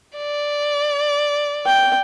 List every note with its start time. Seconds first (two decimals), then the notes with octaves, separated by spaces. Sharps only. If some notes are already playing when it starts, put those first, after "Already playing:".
0.17 D5
1.66 G5